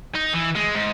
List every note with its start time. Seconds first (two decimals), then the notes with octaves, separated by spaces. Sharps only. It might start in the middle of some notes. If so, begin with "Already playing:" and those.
0.15 D#4
0.33 E3
0.55 G#3
0.74 G#2